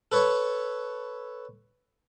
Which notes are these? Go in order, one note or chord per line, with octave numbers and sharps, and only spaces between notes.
A4 B4 C#5